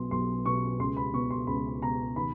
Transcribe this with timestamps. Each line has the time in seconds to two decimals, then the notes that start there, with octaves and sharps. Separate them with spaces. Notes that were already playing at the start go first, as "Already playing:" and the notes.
Already playing: B1 B2 C6
0.11 B1 C6
0.46 B2 C#6
0.79 C#2 C6
0.97 B5
1.13 B2 C#6
1.30 C6
1.47 C#2 B5
1.82 B2 A#5
2.15 D#3 B5